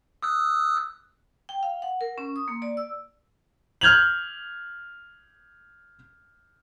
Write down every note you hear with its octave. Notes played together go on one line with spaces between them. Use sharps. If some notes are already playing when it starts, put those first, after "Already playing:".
D#6 E6 F#6
G5
F5
F#5
A#4
C#4
D#6
A#3
D5
E6
F6 G6 G#6 F7 F#7